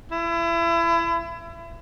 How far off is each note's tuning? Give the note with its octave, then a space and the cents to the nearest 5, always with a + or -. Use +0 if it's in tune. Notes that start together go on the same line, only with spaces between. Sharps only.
E4 +30